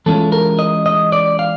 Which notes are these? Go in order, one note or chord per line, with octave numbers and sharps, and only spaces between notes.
E3 G#3 C#4 F4 A4
A#4
D#5
D#5
D5
F5